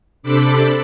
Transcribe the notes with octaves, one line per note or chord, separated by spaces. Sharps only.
C3 C4 D4 A4 B5 D6